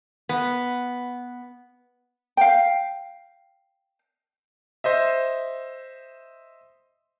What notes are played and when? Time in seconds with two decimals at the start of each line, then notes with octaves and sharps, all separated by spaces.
0.29 B3
2.37 F5 G5
4.84 C5 D#5 E5